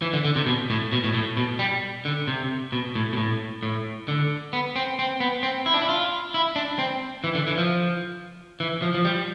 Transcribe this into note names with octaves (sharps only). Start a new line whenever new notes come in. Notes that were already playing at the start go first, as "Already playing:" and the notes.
E3
D3
D3
C3
B2
A2
B2
A2
A2
B2
G3
D3
C3
B2
A2
B2
A2
A2
D3
B3
C4
C4
B3
C4
E4
D4
E4
F4
E4
D4
C4
E3
D3
E3
F3
E3
F3
F3
G3